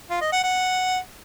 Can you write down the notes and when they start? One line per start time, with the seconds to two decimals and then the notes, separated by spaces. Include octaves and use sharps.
0.10 F4
0.21 D#5
0.33 F#5
0.44 F#5